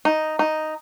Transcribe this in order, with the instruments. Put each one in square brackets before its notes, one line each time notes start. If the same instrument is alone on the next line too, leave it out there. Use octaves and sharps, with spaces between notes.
[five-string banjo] D#4
D#4